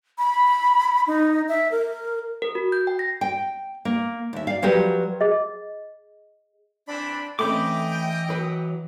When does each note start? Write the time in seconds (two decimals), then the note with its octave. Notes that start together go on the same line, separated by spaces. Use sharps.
0.18 B5
1.07 D#4
1.49 E5
1.72 A#4
2.42 A#4
2.55 F#4
2.72 G6
2.87 G5
2.99 A#6
3.21 G5
3.85 A#3
4.33 D#2 E5
4.47 D5 F5
4.62 F3 F#3 G4 A#4 B4
5.21 G#4 D#5
6.87 E3 C4 D4 B5
7.39 E3 A3 C4 C#4 D#5 G5 B5 D6
8.29 F#3 B4